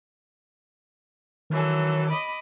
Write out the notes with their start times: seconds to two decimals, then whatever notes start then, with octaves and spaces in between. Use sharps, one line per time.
1.50 D#3 E3 F#3 A4
2.09 D#5 B5 D6